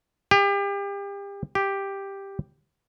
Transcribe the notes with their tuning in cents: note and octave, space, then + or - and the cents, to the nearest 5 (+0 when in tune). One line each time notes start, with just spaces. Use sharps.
G4 +35
G4 +5